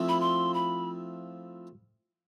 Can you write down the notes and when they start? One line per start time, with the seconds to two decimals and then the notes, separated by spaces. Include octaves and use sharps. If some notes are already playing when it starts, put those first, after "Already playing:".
Already playing: F3 A3 C4 E4
0.09 B5
0.21 C6
0.54 B5